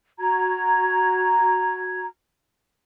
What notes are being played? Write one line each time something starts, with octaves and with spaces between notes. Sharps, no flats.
F#4 A#5 G#6